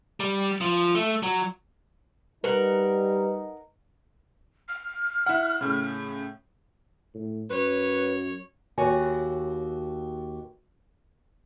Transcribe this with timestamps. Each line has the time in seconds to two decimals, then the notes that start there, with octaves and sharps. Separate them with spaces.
0.20 G3
0.61 F3
0.95 A3
1.23 F#3
2.44 G3 D#4 A#4 B4 F#5
4.69 F6
5.26 E4 F#5
5.61 A2 C#3
7.15 A2
7.50 F#2 B4 C#5
8.78 D#2 F#4 C#5 G#5